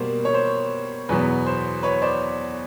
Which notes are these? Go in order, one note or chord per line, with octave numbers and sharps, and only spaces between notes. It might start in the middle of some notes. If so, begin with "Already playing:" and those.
Already playing: B2 G3 A#3 C5
C#5
C5
E2 B2 F#3 B3 B4
C5
B4 C#5
C5 D5